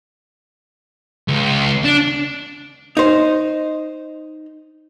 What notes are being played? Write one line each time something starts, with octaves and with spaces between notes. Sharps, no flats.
C#2
D4
D#4 C5